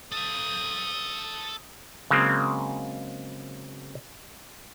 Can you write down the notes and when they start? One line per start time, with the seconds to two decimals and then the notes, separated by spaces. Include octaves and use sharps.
0.12 A4 F5 D#6
2.11 C#3 F#3 G#3 A#3 C4